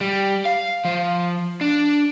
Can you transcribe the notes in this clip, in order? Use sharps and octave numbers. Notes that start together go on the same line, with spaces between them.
G3
F5
F3
D4